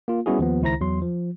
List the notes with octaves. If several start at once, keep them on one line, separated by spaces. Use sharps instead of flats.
A#3 F4
G3 B3 C#4 E4 F#4 G#4
D#2 F3 B3
C#2 D#3 E4 C5 A#5 A#6
E2 F#3 C6
F3